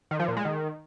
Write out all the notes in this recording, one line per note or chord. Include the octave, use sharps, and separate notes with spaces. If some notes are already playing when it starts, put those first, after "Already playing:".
D#3
F3
A#2
G#3
D#3